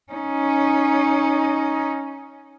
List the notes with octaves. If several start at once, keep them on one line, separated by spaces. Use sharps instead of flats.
C#4 D#4